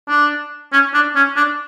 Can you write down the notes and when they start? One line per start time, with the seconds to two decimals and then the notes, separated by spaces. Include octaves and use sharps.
0.08 D4
0.72 C#4
0.94 D4
1.16 C#4
1.36 D4